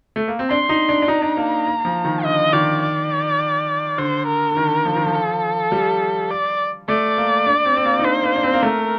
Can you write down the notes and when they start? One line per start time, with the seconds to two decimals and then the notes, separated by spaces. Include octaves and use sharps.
0.16 A3
0.28 A#3
0.39 C4
0.50 D4 C6
0.69 D#4
0.89 D4
1.02 D4
1.08 D#4 A#5
1.22 D4
1.37 A#3
1.66 A#3
1.85 F3
2.05 D#3
2.24 D3 D#5
2.53 D#3 D5
2.82 D5
3.98 D3 C5
4.27 A#4
4.52 D3
4.57 D#3
4.85 F3
4.96 D#3
5.07 F3
5.14 A4
5.72 G3
6.31 D5
6.88 A3 D5
7.17 A#3
7.46 D4
7.65 C4
7.76 C4
7.85 A#3
7.99 D#4
8.04 D4 C5
8.23 A#3
8.36 D4
8.43 C4
8.54 A#3
8.62 A3 A#4